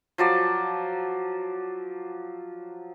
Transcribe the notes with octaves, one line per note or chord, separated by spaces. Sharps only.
F3 F#3 D5